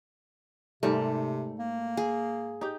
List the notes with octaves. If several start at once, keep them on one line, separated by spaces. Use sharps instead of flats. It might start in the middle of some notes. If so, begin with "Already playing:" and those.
G#2 C3 G3 A3 A#4
A#3
G#4
D#4 G4